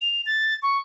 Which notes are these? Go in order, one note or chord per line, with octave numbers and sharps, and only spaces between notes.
F7
A6
C#6